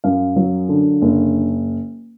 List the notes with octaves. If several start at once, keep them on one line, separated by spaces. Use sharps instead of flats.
F#2 F5
F#3
D3
F#1